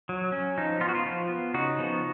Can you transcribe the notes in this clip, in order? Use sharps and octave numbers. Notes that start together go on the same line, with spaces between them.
F#3
C#4
F3 D#4
B3 F4
F#4
F4
F3
B3
C#3 D#4 F#4
F3 B3